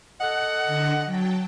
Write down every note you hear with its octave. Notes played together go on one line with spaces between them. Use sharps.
A4 D#5 F#5
D3 A#6
F#3 G5 A5